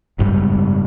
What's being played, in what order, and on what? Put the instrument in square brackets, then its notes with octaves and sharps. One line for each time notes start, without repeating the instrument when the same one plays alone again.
[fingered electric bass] F#1 G#2 G3